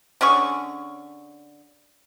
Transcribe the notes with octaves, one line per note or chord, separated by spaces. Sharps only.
D3 C#4 G#4 C#6